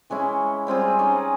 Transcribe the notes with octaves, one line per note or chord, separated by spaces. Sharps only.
E3 G#3 C#4 E4
G3 C4 F4 G#4
C#4 D#4 C5